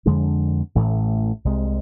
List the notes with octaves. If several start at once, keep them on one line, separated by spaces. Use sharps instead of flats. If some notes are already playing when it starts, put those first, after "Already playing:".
F2 D3 G#3 D4
A1 A2 E3 A3
C2 C3 G#3